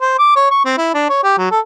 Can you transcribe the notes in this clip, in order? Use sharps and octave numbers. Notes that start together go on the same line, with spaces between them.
C5
D6
C#5
C#6
C4
E4
D4
C#5
G4
F#3
A4